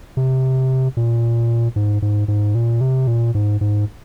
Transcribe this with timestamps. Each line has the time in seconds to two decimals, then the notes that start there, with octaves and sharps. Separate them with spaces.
0.17 C3
0.97 A#2
1.76 G#2
2.02 G#2
2.28 G#2
2.55 A#2
2.81 C3
3.07 A#2
3.35 G#2
3.61 G#2